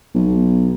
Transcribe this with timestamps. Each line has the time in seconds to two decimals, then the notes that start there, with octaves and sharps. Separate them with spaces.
0.14 B1